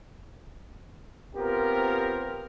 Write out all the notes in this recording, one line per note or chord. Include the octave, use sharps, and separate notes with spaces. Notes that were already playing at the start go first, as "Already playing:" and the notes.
B3 C4 F4 G4 A#4